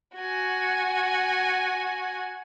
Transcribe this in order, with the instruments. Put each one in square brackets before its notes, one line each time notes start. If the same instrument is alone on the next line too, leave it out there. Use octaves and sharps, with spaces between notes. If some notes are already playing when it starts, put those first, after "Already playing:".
[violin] F#4 G#5